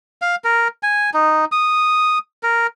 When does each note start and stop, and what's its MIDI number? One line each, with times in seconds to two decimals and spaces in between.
0.22 0.36 77
0.44 0.68 70
0.83 1.10 80
1.14 1.45 63
1.52 2.18 87
2.43 2.67 70